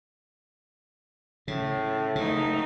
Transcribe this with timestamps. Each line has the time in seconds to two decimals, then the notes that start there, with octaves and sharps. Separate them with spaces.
1.48 A2 C#3
2.16 F#1 C#3 A3 D#4